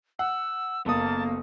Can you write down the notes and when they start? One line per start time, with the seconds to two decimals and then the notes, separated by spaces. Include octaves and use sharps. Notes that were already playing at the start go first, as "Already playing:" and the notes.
0.19 F#5 E6
0.86 F#1 A#3 B3 A4 A5 D#6